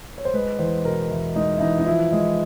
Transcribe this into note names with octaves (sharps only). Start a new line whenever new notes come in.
C#5
C5
G#3 B4
E2 C5
B2 A#4
E2 E4
G#3 D#4
E4
E2 D#4
D#4
F3 E4
G#3